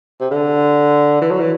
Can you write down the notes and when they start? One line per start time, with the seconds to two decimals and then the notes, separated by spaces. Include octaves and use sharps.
0.20 C3
0.31 D3
1.21 E3
1.31 F#3
1.40 E3